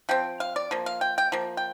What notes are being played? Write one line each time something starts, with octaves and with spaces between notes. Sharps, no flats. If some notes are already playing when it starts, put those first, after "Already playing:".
F3 C4 G5
F5
D5
F3 A#3
F5
G5
G5
F3 A#3
G5